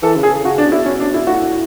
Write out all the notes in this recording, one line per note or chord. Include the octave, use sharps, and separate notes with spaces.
E3 A4
C#3
G#4
C#3
C#3 F#4
D4
B2
E4
C#4
D4
E4
A2 F#4